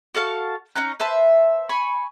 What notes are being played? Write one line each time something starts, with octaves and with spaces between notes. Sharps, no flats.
F#4 A4 F5 A5
C#4 D#4 A#5 F#6
B4 C5 E5 A5
G#5 B5 C#6